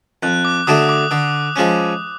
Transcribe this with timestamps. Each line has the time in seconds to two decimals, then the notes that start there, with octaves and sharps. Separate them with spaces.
0.23 F2 F#6
0.45 D6
0.67 D3 F#3 A3 D4 D#6
0.89 D6
1.11 D3 D#6
1.56 F3 G#3 C#4